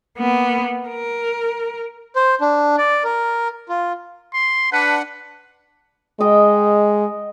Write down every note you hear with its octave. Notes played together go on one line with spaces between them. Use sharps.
A#3 B3
A#4
C5
D4
D5
A#4
F4
C6
D4 B4 F#5
G#3 D#5 G5